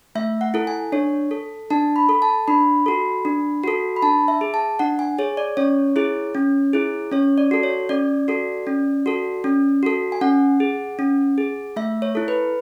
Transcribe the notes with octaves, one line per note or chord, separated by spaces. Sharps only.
A3 E5
F#5
E4 A4
G#5
D4 C#5
A4
D4 A5
B5
A4
A5
D4 B5
F#4 A4
D4
F#4 A4
B5
D4 A5
E5
G#4
A5
D4 F#5
G#5
G#4 C#5
D5
C#4 C#5
E4 G#4
C#4
E4 G#4
C#4 C#5
D5
F#4 A4
C#5
C#4 D5
F#4 A4
C#4
F#4 A4
C#4
F#4 A4
G#5
C#4 F#5
G#4
C#4
G#4
A3 E5
C#5
E4 A4
B4